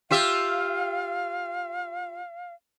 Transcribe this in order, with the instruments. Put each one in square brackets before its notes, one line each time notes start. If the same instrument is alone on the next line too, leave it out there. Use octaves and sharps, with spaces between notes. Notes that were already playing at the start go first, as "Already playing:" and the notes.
[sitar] F4 G4 E5 [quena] F5